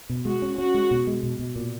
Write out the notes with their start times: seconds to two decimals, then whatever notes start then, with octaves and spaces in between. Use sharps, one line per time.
0.10 B2
0.25 G#3 F#4
0.42 C#4
0.58 C#4 F#4
0.74 G#3
0.91 B2
1.07 G#3
1.23 B2
1.39 B2
1.56 A#2